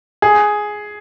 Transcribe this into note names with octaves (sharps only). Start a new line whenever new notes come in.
G#4